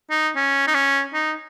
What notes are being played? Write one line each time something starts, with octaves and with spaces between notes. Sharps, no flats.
D#4
C#4
D#4
C#4
D#4